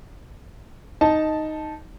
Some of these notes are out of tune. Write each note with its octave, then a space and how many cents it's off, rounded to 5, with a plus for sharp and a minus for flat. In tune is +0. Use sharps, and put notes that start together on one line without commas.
D#4 +0 A5 -5